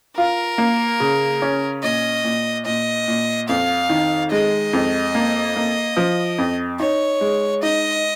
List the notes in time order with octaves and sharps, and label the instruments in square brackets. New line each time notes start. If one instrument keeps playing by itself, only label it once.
[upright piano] F4 [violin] A#4
[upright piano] A#3
C#3
C#4
[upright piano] A#2 [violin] D#5
[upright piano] A#2
[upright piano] A#2 [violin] D#5
[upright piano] A#2
[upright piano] F2 [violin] F5
[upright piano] D#3
[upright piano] G#3 [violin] D#5
[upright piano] F2
A#3
A#3
F3
F2
[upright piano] D#4 [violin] C#5
[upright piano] G#3
[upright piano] D#4 [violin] D#5